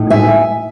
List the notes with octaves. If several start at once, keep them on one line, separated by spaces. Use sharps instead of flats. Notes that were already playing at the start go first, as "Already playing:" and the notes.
Already playing: A2 D#4
E5 G#5